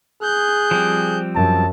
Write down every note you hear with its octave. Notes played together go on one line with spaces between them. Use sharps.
G#4 F#6 G6
F3 G3 C4
F#2 A5